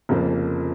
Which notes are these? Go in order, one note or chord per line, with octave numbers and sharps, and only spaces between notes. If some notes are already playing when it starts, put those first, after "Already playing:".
F1 F2 C#3 F3 A#3